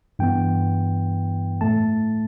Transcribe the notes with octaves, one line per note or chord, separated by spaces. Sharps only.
G2 E3 B3 G5
A2 A3 A5